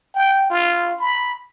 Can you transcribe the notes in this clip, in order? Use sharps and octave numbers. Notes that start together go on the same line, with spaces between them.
G5
F4
B5